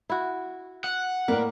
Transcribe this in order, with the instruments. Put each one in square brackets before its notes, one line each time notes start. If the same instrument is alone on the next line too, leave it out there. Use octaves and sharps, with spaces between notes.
[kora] E4 F#4
[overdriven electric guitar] F#5
[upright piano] A2 A#3 [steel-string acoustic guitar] A#4 B4 D5